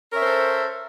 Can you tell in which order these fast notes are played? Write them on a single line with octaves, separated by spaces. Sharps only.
A#4 C#4 E5 C5 A4